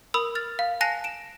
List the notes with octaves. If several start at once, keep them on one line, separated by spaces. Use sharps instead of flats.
A#4 B5 D#6 E6
F6 A6 F7
F5
G#5 A5 F#6 A#6 C7 F7
D7 E7